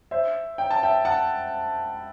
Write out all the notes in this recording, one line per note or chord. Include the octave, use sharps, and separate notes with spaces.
C5 E5
G5
A5
E5 G5
F#5 A5